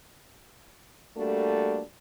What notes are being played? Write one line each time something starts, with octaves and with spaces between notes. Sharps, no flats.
G3 A3 A#3 D4 F#4 A4